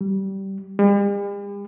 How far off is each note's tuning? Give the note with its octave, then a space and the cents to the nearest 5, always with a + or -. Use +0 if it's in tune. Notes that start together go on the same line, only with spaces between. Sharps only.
G3 -20
G3 +45